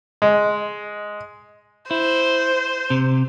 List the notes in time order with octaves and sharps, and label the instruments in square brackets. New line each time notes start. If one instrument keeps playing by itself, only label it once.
[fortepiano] G#3
[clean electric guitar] E4 [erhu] C5
[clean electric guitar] C3